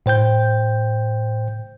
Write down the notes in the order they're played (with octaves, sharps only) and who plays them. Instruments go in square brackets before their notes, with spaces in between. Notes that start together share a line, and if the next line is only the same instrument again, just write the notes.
[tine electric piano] A2 C5 G5 G6